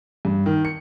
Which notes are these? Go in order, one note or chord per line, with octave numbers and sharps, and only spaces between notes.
G2
D#3
C#7